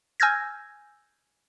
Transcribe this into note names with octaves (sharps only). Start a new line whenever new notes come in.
G#5 E6 F6 G6 G#6 A#6